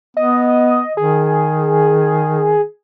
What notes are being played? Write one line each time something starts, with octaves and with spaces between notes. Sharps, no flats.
B3 D#5
D#3 G#4